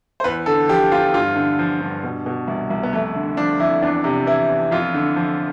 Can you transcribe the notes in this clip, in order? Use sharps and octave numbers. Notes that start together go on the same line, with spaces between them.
C5
E2 B4
D3 A4
F3 G4
E2 F4
G2 F4
D3
F3
G2
B2
B2
C2
C2
B3
F2 A3
D3
F3 D4
F2 E4
E2 D4
C3
E3 E4
E2
F2 F4
D3
F3